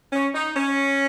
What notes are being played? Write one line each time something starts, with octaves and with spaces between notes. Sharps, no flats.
C#4
D#4
C#4